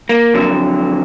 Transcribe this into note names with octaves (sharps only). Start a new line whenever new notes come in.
A#3
F2 D3 F#3